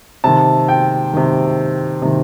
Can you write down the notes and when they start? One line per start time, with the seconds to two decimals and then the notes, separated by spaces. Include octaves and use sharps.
0.24 C3 D#3 A5
0.68 G5
1.14 C3 D#3
2.02 C3 D#3